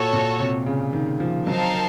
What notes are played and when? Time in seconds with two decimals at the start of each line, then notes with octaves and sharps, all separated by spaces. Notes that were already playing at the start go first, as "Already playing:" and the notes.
Already playing: A#2 F#4 A4 C#5
0.13 A#2
0.40 C3
0.66 C#3
0.93 D#3
1.20 F3
1.47 F#3 C4 D#4 A#4 F5 A5